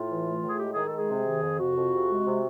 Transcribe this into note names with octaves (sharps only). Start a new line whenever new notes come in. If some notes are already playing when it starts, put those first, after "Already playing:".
Already playing: A2 F4
E3
A3
A2
G#4
G#3 G4
D#3 G#4
A4
G#3 G#4
C3
D#3
F2
C3 F#4
F2
C3
G#3
C3